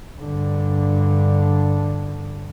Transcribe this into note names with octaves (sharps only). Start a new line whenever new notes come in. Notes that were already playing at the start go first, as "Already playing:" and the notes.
G2 D3